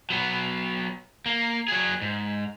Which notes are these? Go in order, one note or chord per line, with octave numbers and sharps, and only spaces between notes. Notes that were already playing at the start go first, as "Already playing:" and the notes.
F#3 B3
A#3
F#3 G#4
G#2